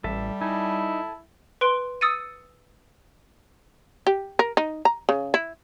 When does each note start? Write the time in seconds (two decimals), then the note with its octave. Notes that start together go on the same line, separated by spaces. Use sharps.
0.04 A1 G3 A4 E5
0.41 D#4 E4 A4 G#5
1.61 B4 C6 D7 G7
2.01 D#6 E6 A6 C#7 D#7
4.07 G4
4.39 A#4
4.57 D#4
4.85 A#5
5.09 C#3
5.34 E4